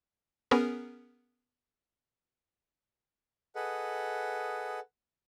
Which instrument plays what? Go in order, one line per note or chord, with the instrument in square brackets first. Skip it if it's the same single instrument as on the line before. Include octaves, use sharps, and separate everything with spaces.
[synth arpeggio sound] B3 C#4 G#4 A#4
[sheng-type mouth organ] G#4 A4 B4 D#5 F#5